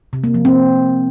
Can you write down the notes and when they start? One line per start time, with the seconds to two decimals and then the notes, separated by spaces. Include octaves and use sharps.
0.13 C3
0.24 A#3
0.34 F3
0.45 C4